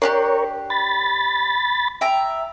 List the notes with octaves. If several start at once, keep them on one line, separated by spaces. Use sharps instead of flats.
D4 F#4 G4 A#4 C#5
B5 A6
E5 G5 A#5